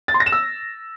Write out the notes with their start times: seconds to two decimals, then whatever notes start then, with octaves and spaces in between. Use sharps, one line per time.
0.08 A6
0.14 C6
0.20 A#6
0.26 E7
0.32 E6